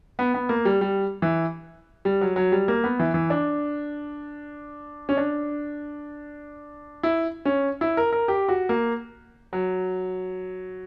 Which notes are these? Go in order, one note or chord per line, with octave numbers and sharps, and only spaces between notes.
B3
B3
A#3
G3
G3
E3
G3
F#3
F#3
G3
A#3
B3
E3
E3
D4
C#4
D4
E4
C#4
E4
A#4
A#4
G4
F#4
A#3
F#3